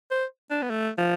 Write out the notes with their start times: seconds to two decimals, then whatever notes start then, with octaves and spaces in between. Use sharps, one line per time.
0.11 C5
0.51 D4
0.62 B3
0.70 A3
0.98 F3